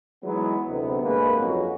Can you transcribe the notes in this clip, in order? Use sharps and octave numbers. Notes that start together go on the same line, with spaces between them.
E3 F#3 G#3 B3 D#4 E4
D2 C3 B3
G2 G#3 A#3 C#4 B4
F2 F#3 F#4